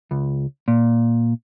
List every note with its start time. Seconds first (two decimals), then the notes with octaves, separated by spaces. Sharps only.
0.11 C#2
0.68 A#2